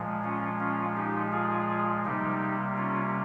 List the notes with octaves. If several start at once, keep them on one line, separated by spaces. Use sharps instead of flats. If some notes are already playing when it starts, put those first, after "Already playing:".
Already playing: A#2 F3 G#3
C#4 F4
C#4 F4
D#4 G4
F4 G#4
C3 G3 A#3 D#4 G4
C#4 F4